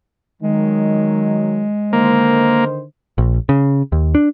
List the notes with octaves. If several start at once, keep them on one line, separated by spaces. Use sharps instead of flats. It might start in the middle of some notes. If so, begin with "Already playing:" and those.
D#3 F#3 G#3
D3 D#3 A#3 C5
A#1
C#3
D#2
D4